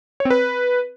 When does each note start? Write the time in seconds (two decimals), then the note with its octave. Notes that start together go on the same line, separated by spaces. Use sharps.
0.20 C#5
0.25 C4
0.30 B4